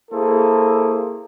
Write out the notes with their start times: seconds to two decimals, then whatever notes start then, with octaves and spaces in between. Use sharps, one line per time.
0.11 A#3 E4 G#4 A4 C5